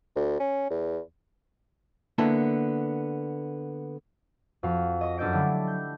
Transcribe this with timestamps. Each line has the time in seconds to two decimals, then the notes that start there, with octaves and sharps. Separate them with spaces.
0.16 D2
0.40 C#4
0.70 E2
2.18 D3 A#3 B3 E4 A5
4.63 F2 F#4 F5
5.01 D#5 C#6 A#6
5.18 F#2 D4 A4 D#5 G6 D7
5.33 D3 F#3 G3 A3 E4
5.67 G6